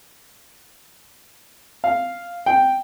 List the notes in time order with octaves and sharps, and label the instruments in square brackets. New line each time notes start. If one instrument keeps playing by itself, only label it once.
[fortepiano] F5
G5